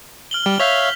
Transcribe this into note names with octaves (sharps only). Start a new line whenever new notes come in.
F6 F#7 G7
G3 G4
C#5 E5 F5 G6 B6 F7